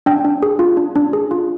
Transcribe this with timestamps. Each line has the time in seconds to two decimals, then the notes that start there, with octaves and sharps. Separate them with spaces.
0.06 D4 G5
0.25 D4
0.43 G#4
0.59 F4
0.77 D4
0.96 D4
1.13 G#4
1.31 F4